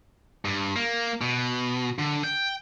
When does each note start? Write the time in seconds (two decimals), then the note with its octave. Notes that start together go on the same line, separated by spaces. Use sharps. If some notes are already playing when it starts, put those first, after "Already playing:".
0.45 G2
0.76 A#3
1.21 B2
1.99 D3
2.24 G5